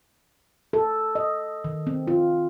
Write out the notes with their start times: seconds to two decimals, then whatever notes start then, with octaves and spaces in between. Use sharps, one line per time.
0.73 A4
1.15 D#5
1.64 D#3
1.87 C4
2.08 F4